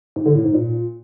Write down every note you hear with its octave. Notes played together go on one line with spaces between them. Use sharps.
G#2
D3
A2
G#2
A#2